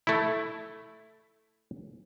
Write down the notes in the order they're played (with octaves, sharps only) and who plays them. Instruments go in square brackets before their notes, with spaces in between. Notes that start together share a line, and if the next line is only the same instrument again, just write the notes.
[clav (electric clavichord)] A3 E4